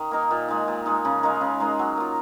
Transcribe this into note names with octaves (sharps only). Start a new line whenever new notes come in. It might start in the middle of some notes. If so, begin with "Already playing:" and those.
Already playing: D#3
A#3 D#4 A#4
A#2
G#3 D#4
A#2
G#3 D#4
C#3
G#3 D#4 A#4
C#3
G#3 D#4 A#4
F#3
A#3 F4